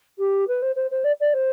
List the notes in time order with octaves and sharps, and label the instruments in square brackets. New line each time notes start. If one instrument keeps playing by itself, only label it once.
[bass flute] G4
B4
C5
C5
C5
D5
D5
C5